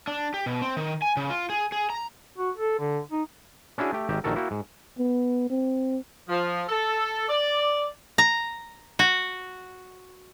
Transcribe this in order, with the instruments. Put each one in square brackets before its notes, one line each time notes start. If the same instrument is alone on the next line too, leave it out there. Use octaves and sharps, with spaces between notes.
[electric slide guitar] D4
G4
B2
C4
D#3
G#5
C#3
F4
G#4
G#4
A#5
[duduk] F#4
A4
D3
D#4
[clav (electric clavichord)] C#4 D4 E4 F#4 G#4
A3 G4 G5
G#1 D#3 G4 E5 A#5
A#1 D#3 F#4 A4 A#4
A#3 E4 F#4 G5
G#2
[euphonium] B3
C4
[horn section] F3
A4
D5
[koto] A#5
F#4